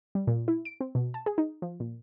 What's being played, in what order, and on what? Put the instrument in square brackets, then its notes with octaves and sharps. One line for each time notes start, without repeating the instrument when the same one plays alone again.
[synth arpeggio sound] G3
A#2
E4
D7
C4
B2
A5
G#4
D#4
F3
A#2